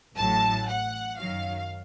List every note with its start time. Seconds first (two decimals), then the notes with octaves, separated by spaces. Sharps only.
0.16 A1 A2 F#3 A5
0.67 F#5
1.17 F#2 D#3 F#3 F5